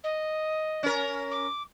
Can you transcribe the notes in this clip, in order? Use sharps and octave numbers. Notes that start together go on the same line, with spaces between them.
D#5
C#4 A#4
D6